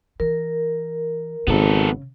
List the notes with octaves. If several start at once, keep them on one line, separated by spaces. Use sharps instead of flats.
E3 A#4
G#1 C#3 B3 A4